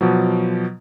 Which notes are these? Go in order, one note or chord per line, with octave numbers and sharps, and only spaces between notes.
B2 F3 F#3